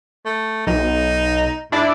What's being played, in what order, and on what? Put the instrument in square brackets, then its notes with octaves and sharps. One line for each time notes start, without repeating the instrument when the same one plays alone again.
[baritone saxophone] A3
[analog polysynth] B1 [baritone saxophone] D#4
[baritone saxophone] G#2 [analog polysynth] D4 E4 D5